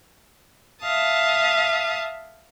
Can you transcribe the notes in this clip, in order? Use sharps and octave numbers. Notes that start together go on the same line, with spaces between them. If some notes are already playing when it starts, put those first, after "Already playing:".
E5 F5 A5 D#6